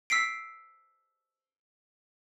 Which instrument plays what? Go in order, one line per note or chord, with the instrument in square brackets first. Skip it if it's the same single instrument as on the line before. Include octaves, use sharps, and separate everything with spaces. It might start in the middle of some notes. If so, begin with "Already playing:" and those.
[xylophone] E6 B6 C7 D7